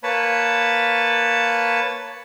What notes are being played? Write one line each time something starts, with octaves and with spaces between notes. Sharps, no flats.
A#3 B4 C#5 A5 B5